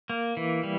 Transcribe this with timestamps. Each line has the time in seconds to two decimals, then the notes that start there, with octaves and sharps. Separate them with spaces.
0.10 A#3
0.37 E3
0.63 G3